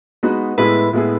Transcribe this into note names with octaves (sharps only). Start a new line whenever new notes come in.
G#3 B3 D#4 F#4 B4
A2 G#3 B3 E4 G#4 B4
A2 G#3 B3 E4 G#4